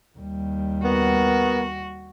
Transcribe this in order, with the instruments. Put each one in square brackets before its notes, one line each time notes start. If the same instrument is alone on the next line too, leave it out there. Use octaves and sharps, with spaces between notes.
[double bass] D#2 G3
[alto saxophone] B3 [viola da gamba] F#4 [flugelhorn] A#4